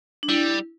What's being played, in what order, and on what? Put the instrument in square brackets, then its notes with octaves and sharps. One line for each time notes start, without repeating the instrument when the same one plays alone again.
[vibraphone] D4
[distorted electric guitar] G3 [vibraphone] E4